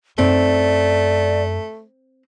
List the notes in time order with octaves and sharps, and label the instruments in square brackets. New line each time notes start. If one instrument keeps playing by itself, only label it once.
[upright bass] F#2 D#4 [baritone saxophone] A3 [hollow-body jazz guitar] C4 [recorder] D5